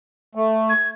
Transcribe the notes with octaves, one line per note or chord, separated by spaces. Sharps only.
A3
G#6